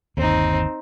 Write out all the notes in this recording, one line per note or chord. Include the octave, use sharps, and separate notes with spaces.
G1 D#2 C4 D#4